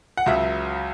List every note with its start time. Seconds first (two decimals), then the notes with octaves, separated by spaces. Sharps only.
0.17 F#5
0.26 C#2 C#3 F#3 E5